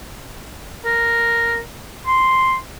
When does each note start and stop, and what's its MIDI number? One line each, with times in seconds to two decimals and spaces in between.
0.85 1.61 70
2.07 2.55 84